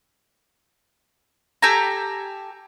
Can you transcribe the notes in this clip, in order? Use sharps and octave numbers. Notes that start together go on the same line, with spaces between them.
G4 A4 G#5 A#5